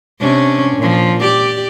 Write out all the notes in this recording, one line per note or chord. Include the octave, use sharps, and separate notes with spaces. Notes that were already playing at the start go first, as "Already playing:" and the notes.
C3 C#4 D4
A#2 F3
G4 D5